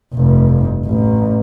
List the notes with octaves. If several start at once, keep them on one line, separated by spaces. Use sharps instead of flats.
F1 G2
A1